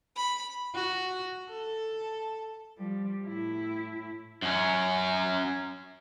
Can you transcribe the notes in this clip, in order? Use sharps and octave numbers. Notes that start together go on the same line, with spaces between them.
B5
F#4
A4
F3 G3
A2 E4
F#2 C#4